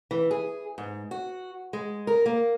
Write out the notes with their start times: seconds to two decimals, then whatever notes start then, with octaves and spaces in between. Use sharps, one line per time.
0.11 E3
0.31 G#4
0.78 G#2
1.11 F#4
1.73 G#3
2.07 A#4
2.26 A#3